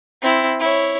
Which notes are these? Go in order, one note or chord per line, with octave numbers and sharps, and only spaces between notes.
C4 E4
E4 C#5